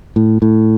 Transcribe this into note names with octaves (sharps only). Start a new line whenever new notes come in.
A2
A2